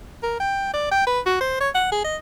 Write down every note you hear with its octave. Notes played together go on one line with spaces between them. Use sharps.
A#4
G5
D5
G5
B4
F#4
C5
C#5
F#5
G#4
D#5